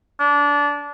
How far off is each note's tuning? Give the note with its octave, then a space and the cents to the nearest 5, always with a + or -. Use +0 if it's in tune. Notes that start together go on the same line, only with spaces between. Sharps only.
D4 -20